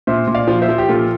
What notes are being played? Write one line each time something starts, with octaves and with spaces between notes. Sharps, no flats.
A#2 C5 E5
A#2
D5 F5
F3
C5 E5
F3
G4
A#2 F4 A4